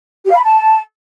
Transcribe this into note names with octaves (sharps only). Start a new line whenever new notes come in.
G4
F5
B5
A5